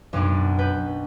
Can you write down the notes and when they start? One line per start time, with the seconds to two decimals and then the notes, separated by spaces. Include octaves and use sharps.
0.13 B1 F#2 C#4 D4
0.59 B4 G6